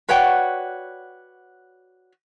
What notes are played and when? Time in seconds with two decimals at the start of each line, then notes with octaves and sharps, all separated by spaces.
0.08 F#4 B4 C#5 D5 F#5 G5